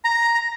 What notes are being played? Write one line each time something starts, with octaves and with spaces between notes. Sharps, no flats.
A#5